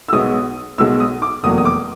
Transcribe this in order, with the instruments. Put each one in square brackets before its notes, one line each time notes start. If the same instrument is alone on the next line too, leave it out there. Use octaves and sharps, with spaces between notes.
[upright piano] E6
B1 B2 G#3 B3 D#6
B1 B2 G#3 B3 E6
D#6
D6
F1 E2 B2 F#3 A#3 D#6
D#6
D6